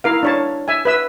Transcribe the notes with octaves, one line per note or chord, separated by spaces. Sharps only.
E4 A#4 F5
D4 C#5 A5
E5 G#5
B4 E5 E6